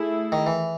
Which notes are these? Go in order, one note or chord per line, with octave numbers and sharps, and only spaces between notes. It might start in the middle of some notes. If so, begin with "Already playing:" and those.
Already playing: A3 E4 G#4
D#3
E3